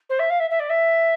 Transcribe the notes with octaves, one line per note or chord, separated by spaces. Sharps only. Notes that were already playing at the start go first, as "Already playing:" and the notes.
C5
E5
F5
E5
E5
D5
E5